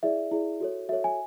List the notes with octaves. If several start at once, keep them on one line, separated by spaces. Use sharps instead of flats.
E4 G#4 D5 E5
E4 G#4 D5
F#4 A4 C#5
F#4 A4 C#5 E5
G#5